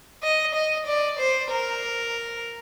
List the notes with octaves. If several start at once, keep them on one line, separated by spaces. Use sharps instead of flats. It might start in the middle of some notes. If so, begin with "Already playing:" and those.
D#5
D#5
D5
C5
A#4